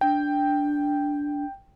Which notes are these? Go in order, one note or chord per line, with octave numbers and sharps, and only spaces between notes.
D4 G5